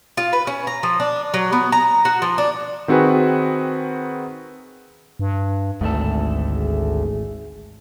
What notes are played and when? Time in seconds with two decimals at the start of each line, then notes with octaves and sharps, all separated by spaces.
0.17 F4
0.33 B4
0.47 C#4
0.67 A#5
0.83 F3
1.00 D4
1.34 F#3
1.52 B3
1.72 A#5
2.05 F#4
2.22 F3
2.38 D4
2.88 D#3 C4 F#4 G#4 B4
5.19 G2
5.81 G#1 D2 G#2 A3 A4
6.55 G#4